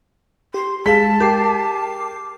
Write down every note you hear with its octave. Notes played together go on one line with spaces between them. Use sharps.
G4 C6
G#3 G#4 F5 A5 B6
G4 A#4 D6 C7